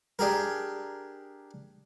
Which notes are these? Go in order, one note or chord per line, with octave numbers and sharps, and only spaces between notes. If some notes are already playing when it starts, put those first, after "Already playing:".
D4 G4 G#4 A#4